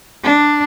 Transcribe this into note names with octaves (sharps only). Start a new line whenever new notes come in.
D4